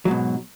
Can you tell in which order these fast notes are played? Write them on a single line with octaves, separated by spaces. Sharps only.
F#3 G#2 B2